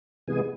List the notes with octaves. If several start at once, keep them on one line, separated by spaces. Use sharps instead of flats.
C3 E3 G#3 B3 G#4 G#5